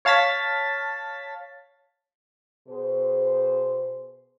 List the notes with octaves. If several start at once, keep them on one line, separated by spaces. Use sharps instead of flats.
C#5 F5 A5 A6 B6
B2 G#4 C5